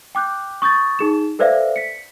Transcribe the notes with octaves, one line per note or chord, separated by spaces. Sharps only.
G5 D6 F#6 G6
C#6 D#6 G6 A6
D#4 G#4 E7
A4 B4 C5 D5 E5 F5
B6 C#7